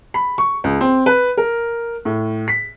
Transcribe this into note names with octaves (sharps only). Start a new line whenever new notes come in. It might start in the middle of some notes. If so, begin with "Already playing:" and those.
B5
C#6
C#2
C4
B4
A#4
A2
B6